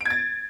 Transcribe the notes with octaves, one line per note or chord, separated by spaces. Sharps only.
G#6 A6 D7